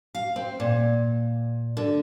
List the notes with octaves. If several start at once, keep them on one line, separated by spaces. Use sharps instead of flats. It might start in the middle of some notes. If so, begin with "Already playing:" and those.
F5
C4
A#2
D3